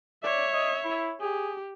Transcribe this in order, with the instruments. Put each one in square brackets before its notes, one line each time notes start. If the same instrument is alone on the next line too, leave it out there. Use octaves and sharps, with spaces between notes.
[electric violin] C#5 E5 [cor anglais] D5
[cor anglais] D#5
E4
[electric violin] G4 [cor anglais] G#4